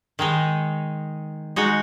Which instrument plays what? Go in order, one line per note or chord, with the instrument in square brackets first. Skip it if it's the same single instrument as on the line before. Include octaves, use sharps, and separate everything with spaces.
[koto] D#3 G#3 D#4
G#3 D#4 F#4